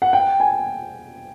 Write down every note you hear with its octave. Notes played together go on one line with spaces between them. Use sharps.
F#5
G5
G#5